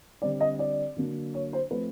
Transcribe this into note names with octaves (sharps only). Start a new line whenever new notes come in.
D3 G3 C4 D5
D#5
D5
D3 F#3 A#3 D4
C#5
C5
F3 A3 C4 B4